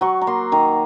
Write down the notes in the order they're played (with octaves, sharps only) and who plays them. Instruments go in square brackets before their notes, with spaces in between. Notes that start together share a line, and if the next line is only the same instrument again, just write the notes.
[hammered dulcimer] F#3 C#6
A#5
A#3 C6
D#3 A#5